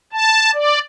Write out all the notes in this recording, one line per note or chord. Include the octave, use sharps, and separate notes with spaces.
A5
D5